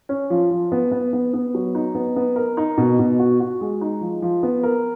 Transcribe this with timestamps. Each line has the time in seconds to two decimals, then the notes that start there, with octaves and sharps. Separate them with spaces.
0.09 C#4
0.30 F3
0.51 F3
0.72 B3
0.92 B3
1.13 B3
1.33 B3
1.54 F#3
1.75 D#4
1.95 B3
2.16 B3
2.36 A#4
2.57 D#4
2.77 B2
2.99 B2
3.19 F#4
3.40 F#4
3.61 G#3
3.81 D#4
4.01 F3
4.22 F3
4.43 B3
4.63 A#4